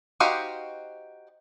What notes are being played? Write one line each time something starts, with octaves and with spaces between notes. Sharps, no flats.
D#4 F#4 G4 C5 F5